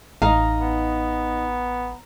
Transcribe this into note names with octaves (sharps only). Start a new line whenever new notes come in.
A1 D#4 D#5 F5 A#5
B3